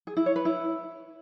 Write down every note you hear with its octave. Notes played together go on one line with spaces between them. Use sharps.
G#4
E4
C#5
B4
E4